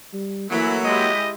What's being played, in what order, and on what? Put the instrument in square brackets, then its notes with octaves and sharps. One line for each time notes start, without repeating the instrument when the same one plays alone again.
[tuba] G3
[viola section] E3 A3 E4 [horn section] F#3 [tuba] A#3
[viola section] G#3 E4 G4 [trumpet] D#5